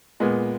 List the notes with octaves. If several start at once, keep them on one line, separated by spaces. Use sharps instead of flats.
A#2 G#3 B3